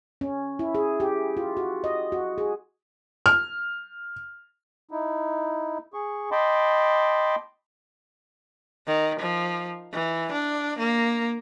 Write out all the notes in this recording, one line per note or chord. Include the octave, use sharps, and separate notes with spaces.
C#4
E4
G#4
G4
F4
F#4
D#5
F#4
G#4
F6
D#4 E4
G#4 C#6
D#5 G5 A5 B5 C6 D6
D#3
F3
E3
D4
A#3